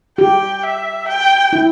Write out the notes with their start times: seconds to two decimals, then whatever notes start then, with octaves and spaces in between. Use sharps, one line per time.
0.18 G4 G5
0.63 E5
1.08 G5
1.53 E4